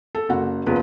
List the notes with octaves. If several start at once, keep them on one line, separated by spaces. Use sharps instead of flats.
A4
F#1 F#4 F#5
F#1 E2 F3 B4